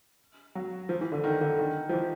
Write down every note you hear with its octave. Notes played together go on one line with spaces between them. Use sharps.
F#3
F3
E3
D3
D#3
D3
D#3
F3
E3